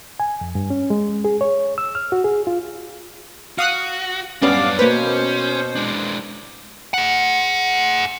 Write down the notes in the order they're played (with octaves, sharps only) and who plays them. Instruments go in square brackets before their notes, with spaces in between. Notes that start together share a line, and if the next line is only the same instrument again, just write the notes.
[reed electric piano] G#5
F2
G2
C#4
G#3
G#4
C#5
E6
F6
F#4
G#4
F4
[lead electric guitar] F#4 [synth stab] F5 D#6 F#6
[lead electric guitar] F#2 D4 [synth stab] G3 B3 C#4 [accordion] F5 D6
[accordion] B2 C5 [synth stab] A#3 B4 [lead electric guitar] C#4
[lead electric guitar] G#3 D4
G#4 F#5